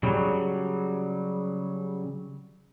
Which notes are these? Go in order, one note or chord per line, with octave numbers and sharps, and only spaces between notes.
C#3 F#3 G3